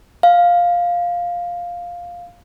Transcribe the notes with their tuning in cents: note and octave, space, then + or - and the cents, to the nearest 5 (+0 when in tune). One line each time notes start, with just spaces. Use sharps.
F5 +5